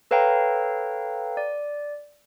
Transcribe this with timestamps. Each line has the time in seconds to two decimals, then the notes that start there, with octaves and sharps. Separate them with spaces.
0.11 A4 B4 C#5 F5 G5 A#5
1.37 D5